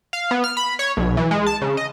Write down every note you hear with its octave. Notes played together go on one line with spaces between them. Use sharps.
F5
B3
F6
B5
C#5
B1
E3
G#3
A5
C#3
D#5